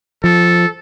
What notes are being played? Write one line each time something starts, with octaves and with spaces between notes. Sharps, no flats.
F3 A4